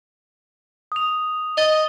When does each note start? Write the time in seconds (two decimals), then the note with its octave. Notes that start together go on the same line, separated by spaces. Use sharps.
0.92 D#6 F7
1.57 D#5 A6 G7